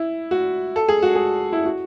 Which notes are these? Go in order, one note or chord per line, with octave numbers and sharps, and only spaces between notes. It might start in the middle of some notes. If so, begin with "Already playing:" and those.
Already playing: E4
F#4
A4
G#4
F#4
G#4
E4
F#4